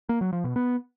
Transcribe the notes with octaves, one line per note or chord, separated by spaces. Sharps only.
A#3
F#3
F3
B2
B3